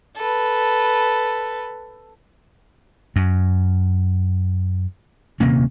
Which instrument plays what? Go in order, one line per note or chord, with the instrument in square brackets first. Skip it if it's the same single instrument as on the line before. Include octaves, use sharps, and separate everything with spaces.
[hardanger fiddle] A4 B4
[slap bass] F#2
D#1 C3 A#3 C#4